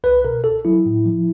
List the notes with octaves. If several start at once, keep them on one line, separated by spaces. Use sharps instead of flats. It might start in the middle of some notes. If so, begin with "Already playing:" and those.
C2 B4
B2 A#4
C2 A4
F#3 E4
A2
F3